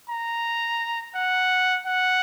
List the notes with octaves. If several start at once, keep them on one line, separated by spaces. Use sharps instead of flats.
A#5
F#5
F#5